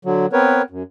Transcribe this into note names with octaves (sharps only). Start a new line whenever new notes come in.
D3 F#3
B3 C4 A#4 B4 C#5
F#2